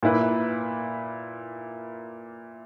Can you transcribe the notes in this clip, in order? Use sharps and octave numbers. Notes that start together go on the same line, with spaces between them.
A#2 A#3 E4 B4